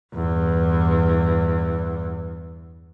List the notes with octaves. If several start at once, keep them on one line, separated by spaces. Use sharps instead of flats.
E2 G2